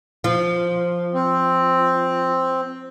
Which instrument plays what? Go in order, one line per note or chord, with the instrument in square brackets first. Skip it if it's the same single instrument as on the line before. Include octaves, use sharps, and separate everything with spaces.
[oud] F3
[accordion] C4